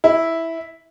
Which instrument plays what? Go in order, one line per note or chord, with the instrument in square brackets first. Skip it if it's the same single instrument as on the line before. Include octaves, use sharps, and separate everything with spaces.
[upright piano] E4